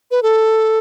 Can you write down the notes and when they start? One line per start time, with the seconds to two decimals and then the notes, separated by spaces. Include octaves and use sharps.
0.11 B4
0.23 A4